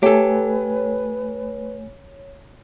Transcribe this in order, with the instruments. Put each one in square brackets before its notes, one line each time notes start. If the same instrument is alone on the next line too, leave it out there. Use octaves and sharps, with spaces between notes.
[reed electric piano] A3 G#5 [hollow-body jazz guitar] G4 A4 [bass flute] B4 [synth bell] C#5